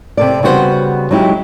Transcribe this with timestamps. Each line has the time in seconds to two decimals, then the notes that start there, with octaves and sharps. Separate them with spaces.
0.17 C3 A4 D5
0.43 C#3 G3 B3 F#4 C5
1.11 F#3 G#3 D#4 E4 G4